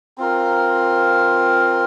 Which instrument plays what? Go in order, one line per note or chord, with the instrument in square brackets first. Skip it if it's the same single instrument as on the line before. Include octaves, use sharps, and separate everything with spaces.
[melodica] C4 F4 A#4